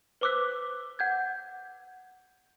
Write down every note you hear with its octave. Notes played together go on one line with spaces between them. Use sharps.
B4 C5 D6 E6 F#6 B6
F#5 G6 G#6